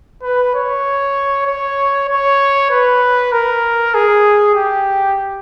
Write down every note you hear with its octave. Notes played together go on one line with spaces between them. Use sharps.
B4
C#5
C#5
C#5
B4
A#4
G#4
G4